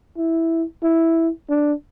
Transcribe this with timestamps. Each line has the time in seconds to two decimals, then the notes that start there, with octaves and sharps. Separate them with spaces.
0.18 E4
0.83 E4
1.49 D4